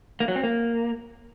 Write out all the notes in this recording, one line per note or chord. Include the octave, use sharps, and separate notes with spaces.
A#3
F#3
C4
A#3